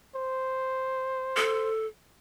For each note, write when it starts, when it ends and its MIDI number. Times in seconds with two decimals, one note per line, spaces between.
0.16 1.71 72
1.37 1.87 69